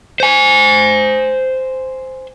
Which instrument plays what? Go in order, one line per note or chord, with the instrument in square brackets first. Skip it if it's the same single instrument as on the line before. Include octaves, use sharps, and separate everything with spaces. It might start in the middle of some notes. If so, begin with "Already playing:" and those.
[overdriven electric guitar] C5 G#5